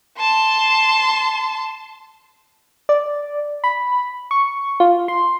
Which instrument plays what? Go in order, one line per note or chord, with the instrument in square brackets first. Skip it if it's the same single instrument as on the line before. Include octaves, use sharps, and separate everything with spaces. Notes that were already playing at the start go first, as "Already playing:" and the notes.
[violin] A5 C6
[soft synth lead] D5
B5
C#6
F4
C6